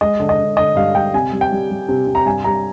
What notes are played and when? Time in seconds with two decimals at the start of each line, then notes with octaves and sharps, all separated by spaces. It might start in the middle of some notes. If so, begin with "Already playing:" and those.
0.01 G#3 D#5
0.20 D3
0.29 D#5
0.38 D3
0.57 D3 D#5
0.76 G2 F5
0.95 G2 G5
1.13 C3 G#5
1.32 G3
1.41 G5
1.52 G3
1.70 G3
1.89 C3
2.07 C3
2.15 A#5
2.26 G2 G#5
2.44 G2 A#5